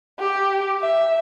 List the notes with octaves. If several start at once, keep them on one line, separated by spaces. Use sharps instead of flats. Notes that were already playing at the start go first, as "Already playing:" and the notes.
G4
E5